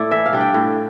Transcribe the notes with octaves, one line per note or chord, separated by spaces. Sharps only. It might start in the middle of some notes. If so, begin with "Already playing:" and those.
Already playing: A2 A3 E4 D5
E3 E5
F5
G3 D4
G5
A2